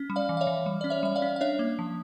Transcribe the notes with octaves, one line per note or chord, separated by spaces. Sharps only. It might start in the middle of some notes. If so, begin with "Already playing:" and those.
Already playing: C#4
G3
D5 F5
E3
F5
C#5 E5
E3
G3
C#4 D5
C#5 E5
G3 E5
D5 F5
C#4
F5
D4 C#5 E5
A#3
F3